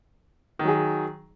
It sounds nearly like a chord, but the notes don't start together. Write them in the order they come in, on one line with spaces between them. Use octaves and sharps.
D#3 F#3 G#4